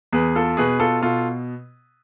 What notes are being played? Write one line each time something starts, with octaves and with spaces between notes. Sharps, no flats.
E2 G#4 B4
F4 A4
B2 G#4 B4
F4 A4
B2 F4 A4